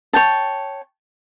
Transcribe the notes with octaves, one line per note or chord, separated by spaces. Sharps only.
C#5 G5 A5